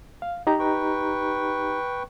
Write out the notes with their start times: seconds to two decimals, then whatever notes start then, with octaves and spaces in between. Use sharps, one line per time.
0.22 F5
0.47 D#4 G4 A#5
0.59 B4 G5 C#6